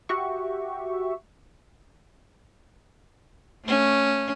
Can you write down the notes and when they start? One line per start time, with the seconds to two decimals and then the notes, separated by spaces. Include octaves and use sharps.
0.09 F#4 G4 E5 C#6
3.66 A3 C#4